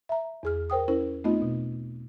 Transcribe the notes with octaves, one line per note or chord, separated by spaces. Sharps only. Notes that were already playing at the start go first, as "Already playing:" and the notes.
E5 A#5
E2 G#4 F6
A#4 C5 G5 D#6
C#4 E4 A#4 C5
A3 B3 C4 D#4 F4 D#5
B2